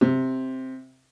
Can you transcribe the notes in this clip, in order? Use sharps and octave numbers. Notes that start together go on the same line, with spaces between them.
C3